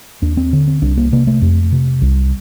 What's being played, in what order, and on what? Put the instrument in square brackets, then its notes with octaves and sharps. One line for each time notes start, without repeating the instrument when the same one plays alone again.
[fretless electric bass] D#2 D4
C4
D3
C4
C2 D4
A#3
C3 A#3
A3
F2
C3
C2